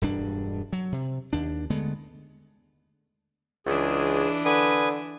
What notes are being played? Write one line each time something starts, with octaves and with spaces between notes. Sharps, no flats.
E1 G2 D4
F#3
C3
D#2 D4
D3 G#3 A3 B3
C#2 E3 D4 G#4
D3 B4 G#5 D#6